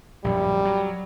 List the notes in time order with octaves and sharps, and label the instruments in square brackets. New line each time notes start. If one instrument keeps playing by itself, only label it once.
[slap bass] A#1 F#2 [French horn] G3
[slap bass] F#3